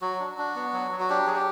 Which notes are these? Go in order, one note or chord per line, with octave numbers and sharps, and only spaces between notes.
F#3 F#4
D4
D4
B3
F#3
F#3
F#4
D4 G4
F#3 G#4
G4